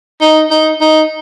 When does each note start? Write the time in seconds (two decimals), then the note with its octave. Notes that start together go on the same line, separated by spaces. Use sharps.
0.21 D#4
0.51 D#4
0.81 D#4